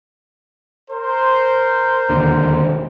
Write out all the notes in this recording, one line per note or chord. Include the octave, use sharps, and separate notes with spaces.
A#4 C5
E1 D#2 D3